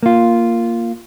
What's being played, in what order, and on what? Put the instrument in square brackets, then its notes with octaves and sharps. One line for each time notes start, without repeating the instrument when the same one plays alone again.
[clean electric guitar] A#3 F4